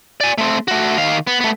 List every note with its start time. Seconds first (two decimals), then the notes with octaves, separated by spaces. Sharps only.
0.21 D5 G#5
0.38 A3 C4
0.68 A3 F#4
0.98 D#3 F5
1.27 B3
1.40 A3 B3